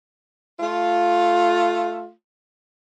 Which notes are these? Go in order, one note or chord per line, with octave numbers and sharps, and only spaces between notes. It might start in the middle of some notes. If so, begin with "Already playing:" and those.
A3 F4